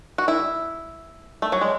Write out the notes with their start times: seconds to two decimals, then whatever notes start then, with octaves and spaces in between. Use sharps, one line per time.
0.18 F#4
0.28 E4
1.42 A3
1.52 F#3
1.61 G#3